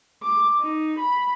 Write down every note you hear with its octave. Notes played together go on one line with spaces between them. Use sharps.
D6
D#4
B5